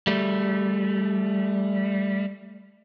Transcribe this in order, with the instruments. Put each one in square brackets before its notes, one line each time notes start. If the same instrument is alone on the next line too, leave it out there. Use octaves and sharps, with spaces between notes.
[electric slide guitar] G3 A3